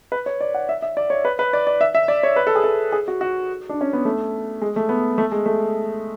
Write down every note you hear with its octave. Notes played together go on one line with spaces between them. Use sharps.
B4
C#5
D5
F#5
E5
E5
D5
C#5
B4
B4
D5
D5
E5
E5
D5
C#5
B4
A4
G#4
A4
G#4
F#4
F#4
D4
C#4
B3
A3
G#3
A3
B3
A3
G#3
A3